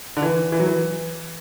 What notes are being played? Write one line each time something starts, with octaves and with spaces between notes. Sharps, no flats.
D3
E3
E3
F#3
E3